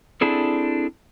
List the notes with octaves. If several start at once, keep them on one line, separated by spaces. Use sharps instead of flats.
C4 D4 E4 G#4 A4